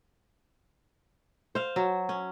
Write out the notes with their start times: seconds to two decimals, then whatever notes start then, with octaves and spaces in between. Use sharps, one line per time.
1.55 C5 F5
1.76 F#3
2.09 C#4